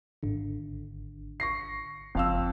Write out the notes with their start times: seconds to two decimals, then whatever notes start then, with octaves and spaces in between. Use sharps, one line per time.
0.23 G#1 D3
1.40 C#6 A#6 C7
2.15 F#1 F2 F5 E6